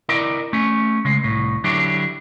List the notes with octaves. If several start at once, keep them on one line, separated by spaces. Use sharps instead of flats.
E4 A#4 D5 D#5
A3 C#4
C#3 G#3
C2 A2
D3 F#3 D4 E4 G4